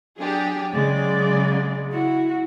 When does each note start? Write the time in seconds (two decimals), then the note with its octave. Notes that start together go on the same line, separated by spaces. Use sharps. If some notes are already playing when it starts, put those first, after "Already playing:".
0.18 F#3 D4 G4 G#4
0.73 C#3 F#3 G#3 D5
1.93 E4 F#4